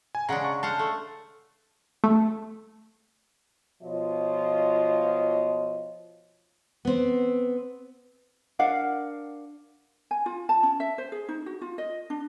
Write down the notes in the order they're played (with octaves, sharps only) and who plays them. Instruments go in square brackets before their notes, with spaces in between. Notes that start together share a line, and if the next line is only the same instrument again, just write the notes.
[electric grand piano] G#5
[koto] C#3 G#3 D4 [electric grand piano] F#5 A#5
[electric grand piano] C#6
[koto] C5 F5 F#5 [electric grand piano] A5
[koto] A3
[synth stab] A3
[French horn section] B2 F3 F4 C#5 D#5
[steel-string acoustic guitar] B3 C4
[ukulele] D4 A#4 F5 F#5
G#5
F4
A5
C#4
E5
C5
G#4
D#4
F#4
F4
D#5
D4